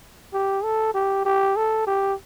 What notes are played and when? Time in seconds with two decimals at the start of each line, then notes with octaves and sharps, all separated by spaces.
0.33 G4
0.64 A4
0.94 G4
1.25 G4
1.56 A4
1.87 G4